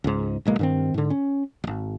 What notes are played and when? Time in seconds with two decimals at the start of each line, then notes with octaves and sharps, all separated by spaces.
0.04 C#2 G#2
0.45 D1 B1 G#3 A#3
0.59 G2 D#3 C4
0.94 G#2 D3
1.10 C#4
1.64 D1 G#1